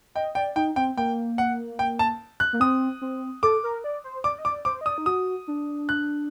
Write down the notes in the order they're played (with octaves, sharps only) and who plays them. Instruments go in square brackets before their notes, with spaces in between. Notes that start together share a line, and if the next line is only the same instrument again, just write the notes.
[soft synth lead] D#5 [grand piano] G5
[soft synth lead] D5 [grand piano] G5
[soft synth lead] D#4 [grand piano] G5
[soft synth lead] C4 [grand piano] G5
[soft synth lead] A#3 [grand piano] G5
[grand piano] F#5
G5
A5
F#6
[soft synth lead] A#3
[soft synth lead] C4 [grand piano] D#6
[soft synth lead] C4
[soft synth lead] A4 [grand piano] D6
[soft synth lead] A#4
D5
C5
[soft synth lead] D5 [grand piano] D6
[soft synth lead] D#5
[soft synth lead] D5 [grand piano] D6
[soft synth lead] C5 [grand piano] D6
[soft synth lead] D#5
[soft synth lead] D5 [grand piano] D#6
[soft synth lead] D#4
[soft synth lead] F#4 [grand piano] D#6
[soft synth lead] D4
[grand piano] F#6